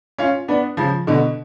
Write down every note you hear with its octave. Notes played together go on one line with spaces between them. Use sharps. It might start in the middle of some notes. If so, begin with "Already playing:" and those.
C#4 F4
B3 D4
C#3 F3
B2 D3